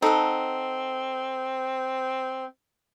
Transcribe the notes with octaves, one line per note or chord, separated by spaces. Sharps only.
C4 D#4 A4 F#5